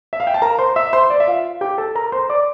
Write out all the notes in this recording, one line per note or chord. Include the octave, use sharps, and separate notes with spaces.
E5
F5
G5
A5
A#4 A#5
C5 C6
E5 E6
C5 C6
D5
E5
F4 F5
G4 G5
A4 A5
A#4 A#5
C5 C6
D5 D6